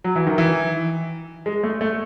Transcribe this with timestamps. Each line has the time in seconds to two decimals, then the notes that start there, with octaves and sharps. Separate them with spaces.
0.04 F#3
0.16 E3
0.27 D#3
0.38 E3
1.46 G#3
1.63 A3
1.81 A3